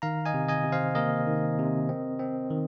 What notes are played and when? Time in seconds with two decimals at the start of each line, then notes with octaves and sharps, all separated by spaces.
0.02 D#3 F5 A#5
0.26 D#5 G#5
0.34 C3
0.48 D#5 G#5
0.64 C3
0.72 C5 F5
0.95 A#3 A#4 D#5
1.27 D#3
1.58 C3
1.89 C4
2.20 C4
2.51 D#3